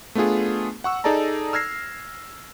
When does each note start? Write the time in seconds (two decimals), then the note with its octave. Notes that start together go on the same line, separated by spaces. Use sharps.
0.15 A3 B3 D4 F4 G#4
0.84 F#5 C#6 E6
1.04 D#4 G#4 A4 D5 A5 A#5
1.53 E6 F6 G#6 A#6 C7